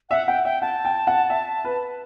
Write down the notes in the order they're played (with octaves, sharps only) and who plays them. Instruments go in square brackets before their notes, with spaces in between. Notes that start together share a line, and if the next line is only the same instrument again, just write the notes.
[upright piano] E5 [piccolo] F#5
[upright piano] F#5 [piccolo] G5
[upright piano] E5 [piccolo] G5
[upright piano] F#5 [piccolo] A5
[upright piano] G5
F#5
E5
B4